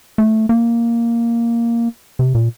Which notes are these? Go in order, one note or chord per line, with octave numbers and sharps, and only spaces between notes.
A3
A#3
C3
A#2